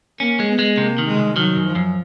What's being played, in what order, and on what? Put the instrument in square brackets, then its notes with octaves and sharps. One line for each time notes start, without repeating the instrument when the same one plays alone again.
[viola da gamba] A#3 [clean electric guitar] C#4
[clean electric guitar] G#3
[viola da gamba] B3
[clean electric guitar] G#3
[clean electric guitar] C3 [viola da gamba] A#3
[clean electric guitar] D#3
[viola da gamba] G#3
[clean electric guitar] C2
[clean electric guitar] D#3 [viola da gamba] F#3
[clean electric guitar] F#2
[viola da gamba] F3
[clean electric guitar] F#2